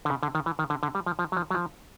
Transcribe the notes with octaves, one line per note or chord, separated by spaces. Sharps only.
D3
C#3
D3
D#3
E3
D#3
D3
D3
G3
F3
F3
F#3
F3
F#3
F3